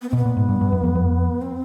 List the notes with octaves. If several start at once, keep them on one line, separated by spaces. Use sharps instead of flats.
B3
C4
B2
B3
A#2
G#2
G2
G2
F#2
F2
F2
C4